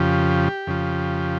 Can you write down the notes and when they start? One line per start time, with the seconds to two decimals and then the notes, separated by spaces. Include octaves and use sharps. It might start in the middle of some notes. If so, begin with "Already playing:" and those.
Already playing: F2 C#3 F3 G4
0.67 F2 C#3 F3